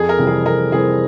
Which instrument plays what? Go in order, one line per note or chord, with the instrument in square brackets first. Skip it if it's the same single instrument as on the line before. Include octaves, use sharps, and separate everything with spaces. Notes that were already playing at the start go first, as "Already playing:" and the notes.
Already playing: [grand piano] F2 [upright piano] G#4
[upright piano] A#4
[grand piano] C3 E3 G3 C4
[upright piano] G#4
[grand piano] F2 [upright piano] A#4
[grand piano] C3 E3 G3 C4 [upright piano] G#4